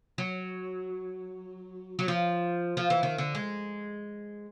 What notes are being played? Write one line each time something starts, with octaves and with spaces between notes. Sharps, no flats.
F#3
F#3
F3
F3
E3
D#3
D3
G#3